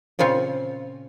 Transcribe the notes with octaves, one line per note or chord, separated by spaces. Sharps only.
A#2 C#3 C4 F4 C#5